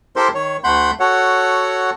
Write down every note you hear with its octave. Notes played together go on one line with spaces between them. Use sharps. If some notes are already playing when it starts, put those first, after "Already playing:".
E4 G4 A4 A#4 C5 C6
D#3 C#5
D2 A3 F#5 B5 C6 G6
F#4 A4 C#5 F#5